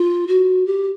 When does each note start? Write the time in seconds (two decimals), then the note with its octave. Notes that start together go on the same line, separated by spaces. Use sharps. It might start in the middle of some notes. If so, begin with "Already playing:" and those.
Already playing: F4
0.28 F#4
0.66 G4